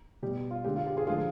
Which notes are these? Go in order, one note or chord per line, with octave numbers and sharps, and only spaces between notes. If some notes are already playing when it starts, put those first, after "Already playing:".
B2 G3 G4
F4
D3 G#3 G4
F4
G4
F4 G#4
D3 F3 G#3 F4 G#4